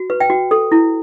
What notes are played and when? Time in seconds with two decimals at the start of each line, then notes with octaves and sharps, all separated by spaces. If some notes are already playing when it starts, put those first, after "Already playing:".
Already playing: F#4
0.10 B4
0.20 G5
0.30 F#4
0.51 A4
0.72 E4